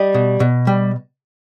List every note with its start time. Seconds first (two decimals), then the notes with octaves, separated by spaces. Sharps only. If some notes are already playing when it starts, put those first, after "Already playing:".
Already playing: G3 D#5
0.14 B2
0.40 B2
0.67 G3